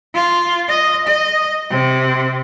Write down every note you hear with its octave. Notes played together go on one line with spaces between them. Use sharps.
F4
D#5
D#5
C3